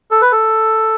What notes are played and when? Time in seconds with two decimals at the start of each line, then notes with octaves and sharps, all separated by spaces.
0.11 A4
0.21 B4
0.32 A4